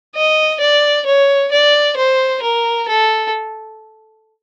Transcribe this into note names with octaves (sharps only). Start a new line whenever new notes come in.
D#5
D5
C#5
D5
C5
A#4
A4